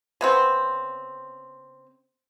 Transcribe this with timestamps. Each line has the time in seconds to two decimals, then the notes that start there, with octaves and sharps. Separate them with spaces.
0.21 C#3 B3 C4